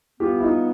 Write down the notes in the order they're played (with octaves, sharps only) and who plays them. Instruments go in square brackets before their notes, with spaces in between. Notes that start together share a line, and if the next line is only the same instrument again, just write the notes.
[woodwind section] E3 G3 B3 [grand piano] F4 G4
[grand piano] E4
D#4 F4